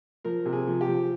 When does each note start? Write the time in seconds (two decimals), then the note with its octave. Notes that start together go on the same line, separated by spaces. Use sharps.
0.25 F3 A#4
0.45 C3
0.53 G#4
0.67 F3
0.81 G4
0.88 F3